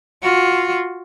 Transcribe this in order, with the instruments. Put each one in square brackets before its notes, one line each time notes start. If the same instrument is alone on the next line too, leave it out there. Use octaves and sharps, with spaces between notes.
[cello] F4 F#4